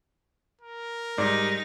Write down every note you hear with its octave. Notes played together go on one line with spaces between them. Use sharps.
A#4
G#2 G3 D#4 D5 A#5